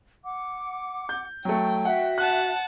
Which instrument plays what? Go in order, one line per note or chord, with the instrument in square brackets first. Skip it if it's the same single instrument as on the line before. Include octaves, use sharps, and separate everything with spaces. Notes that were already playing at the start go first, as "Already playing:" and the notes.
[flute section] F#5 D6
[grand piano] G6
[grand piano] F#3 A3 [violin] G5
[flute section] F#4 E5 [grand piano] F#5
[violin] F#5 A5 [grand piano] F#6